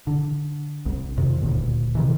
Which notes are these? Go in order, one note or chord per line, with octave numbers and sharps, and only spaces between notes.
D3
C2
F2 C3 D#3
D#1 D2 A#2
C3 D#3 E3